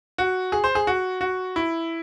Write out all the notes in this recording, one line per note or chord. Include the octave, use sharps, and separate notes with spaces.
F#4
G#4
C5
G#4
F#4
F#4
E4